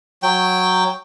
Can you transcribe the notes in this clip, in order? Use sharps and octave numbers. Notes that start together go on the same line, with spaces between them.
F#3 G5